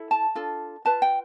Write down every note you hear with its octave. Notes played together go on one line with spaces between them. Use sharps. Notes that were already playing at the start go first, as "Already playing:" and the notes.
Already playing: E4 A4
A5
D4 F4 A4
F4 B4 A5
G5